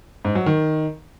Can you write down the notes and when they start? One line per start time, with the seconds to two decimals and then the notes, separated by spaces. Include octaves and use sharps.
0.25 G#2
0.35 F#3
0.46 D#3